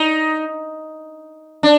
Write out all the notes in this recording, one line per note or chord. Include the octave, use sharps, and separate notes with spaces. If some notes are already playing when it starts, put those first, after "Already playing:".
Already playing: D#4
D4